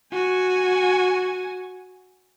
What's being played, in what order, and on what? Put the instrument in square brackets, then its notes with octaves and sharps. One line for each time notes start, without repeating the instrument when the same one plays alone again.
[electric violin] F#4 G#5